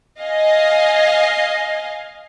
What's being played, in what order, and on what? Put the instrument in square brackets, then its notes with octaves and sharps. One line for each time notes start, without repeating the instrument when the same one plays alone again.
[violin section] D#5 F5 G#5